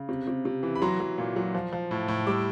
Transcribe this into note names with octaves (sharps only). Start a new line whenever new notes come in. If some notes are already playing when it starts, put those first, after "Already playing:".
Already playing: C#3
C3
C3
C3
E3
B5
F#3 A#5 C6
F#3
A#2
F#3
F3
F3
A2
A2
G3 D6 E6